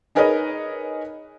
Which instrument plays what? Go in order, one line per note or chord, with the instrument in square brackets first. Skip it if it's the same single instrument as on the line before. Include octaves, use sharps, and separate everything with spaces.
[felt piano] D#4 G#4 A#4 B4 C#5 D#5